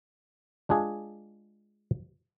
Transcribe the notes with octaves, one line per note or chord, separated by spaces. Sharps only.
G#3 D4 F4 G#4